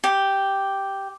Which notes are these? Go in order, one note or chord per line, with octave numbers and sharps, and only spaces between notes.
G4